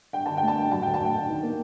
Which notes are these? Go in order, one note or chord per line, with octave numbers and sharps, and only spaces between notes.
G2 G5
D3 A5
G5
A3
A5
G2 G5
F#3 A5
D2 G5
A5
D2
G5
D2
D#3
A#3